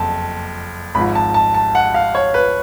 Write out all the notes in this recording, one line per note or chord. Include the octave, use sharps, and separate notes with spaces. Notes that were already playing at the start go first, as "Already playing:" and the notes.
Already playing: F#1 F2 A5
G#1 G#2 F3 B5
A5
A5
A5
F#5
F5
C#5
B4